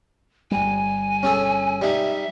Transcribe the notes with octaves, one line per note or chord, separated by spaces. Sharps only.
G1 G3 G#5
C#4 G#4 A4
G3 D#4 E5